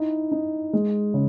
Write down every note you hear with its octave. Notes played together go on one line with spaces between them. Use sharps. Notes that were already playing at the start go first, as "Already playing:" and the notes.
Already playing: D#4 E4
D#4
G#3
C#3